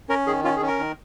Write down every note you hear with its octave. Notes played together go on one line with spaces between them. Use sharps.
C#4 A#4
D#3 G#4
C#4 F4
G#4
C#4
A#4
D#3